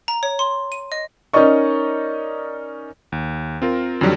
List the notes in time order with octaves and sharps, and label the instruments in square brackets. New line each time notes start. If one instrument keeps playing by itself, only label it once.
[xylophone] A#5
C#5
C6
D#7
D#5
[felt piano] C#4 D#4 A#4 D5 D#5 C#6
[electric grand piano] D#2
C4 F4 A#4
F2 D3 D#3 F#3 G3